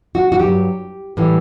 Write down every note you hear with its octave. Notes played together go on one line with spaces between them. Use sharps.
F#4
F#4
G2 F#3 G4
A2 E3 G3